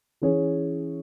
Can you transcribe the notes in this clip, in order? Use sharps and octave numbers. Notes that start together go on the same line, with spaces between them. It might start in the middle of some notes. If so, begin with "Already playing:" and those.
E3 C#4 G#4 C#5